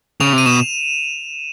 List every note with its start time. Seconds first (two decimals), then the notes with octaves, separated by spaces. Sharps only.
0.20 C#3 F7
0.33 C3
0.38 D#7
0.46 B2 E7